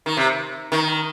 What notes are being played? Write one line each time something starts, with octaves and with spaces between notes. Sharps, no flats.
D#3
C3
D#3